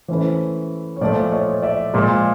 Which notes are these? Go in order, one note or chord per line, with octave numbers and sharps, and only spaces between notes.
E3 A3 C#4 E4 C5
C#5
A#2 F3 A3 C5 D5
C#5 D#5
D5 E5
A#2 F3 G#3